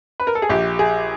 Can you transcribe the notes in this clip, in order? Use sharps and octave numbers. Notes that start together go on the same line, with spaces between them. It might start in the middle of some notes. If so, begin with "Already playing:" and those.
B4
A#4
A4
G#4
A#1 G4
G#4